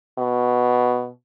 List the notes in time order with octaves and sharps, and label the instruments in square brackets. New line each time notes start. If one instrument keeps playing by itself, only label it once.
[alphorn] B2